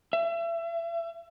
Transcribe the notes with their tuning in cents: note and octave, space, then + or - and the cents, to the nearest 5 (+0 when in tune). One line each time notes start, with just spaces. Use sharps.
E5 +35